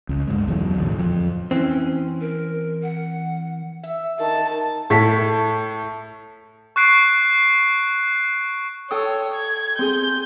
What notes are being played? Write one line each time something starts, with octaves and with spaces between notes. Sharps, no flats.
C#2
D2 G2 G#3
B1 E2 D3 F#3
E2 A2
F2
E3 C4 C#4
A#4
F#5
E5
D#3 A5
A2 A3 B6
C#6 F#6 C7 D7
A4 C#5 G5 D#6
G#6
C4 G#4 G6